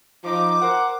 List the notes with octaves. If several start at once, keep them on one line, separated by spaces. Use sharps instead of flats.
F3 D#4 D6
A#4 C5 F#5